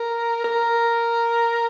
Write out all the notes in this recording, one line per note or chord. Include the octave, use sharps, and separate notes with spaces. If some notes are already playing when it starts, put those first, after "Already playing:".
Already playing: A#4
A#4